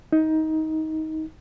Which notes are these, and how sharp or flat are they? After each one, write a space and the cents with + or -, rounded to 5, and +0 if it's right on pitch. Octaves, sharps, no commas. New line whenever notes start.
D#4 +20